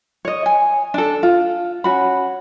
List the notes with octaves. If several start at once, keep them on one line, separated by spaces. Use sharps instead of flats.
C#5 D#5
G#5
D4 A4
F4
C#4 F#4 B5